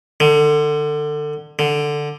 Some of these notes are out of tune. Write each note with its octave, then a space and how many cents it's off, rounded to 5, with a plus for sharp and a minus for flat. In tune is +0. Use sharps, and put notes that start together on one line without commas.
D3 +25
D3 +5